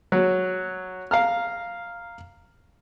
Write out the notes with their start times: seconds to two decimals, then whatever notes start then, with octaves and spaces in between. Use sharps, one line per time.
0.12 F#3
1.11 F5 A#5 F6